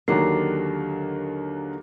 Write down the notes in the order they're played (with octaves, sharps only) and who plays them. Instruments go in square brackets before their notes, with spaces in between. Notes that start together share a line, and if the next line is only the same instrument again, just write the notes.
[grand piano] D#2 F#3 [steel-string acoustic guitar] D3 [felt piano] A#3 D#4 [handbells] G4 C7